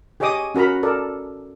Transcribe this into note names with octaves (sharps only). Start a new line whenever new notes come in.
G4 G#4 C#5 D#5 D6 D#6
C#4 F#4 A#4 A#5 B5
A4 A#4 D5